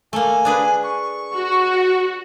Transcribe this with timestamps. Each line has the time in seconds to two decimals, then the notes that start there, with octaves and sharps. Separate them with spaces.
0.13 A3 A#3 G#5
0.45 D4 G#4 B4
0.83 C#6
1.35 F#4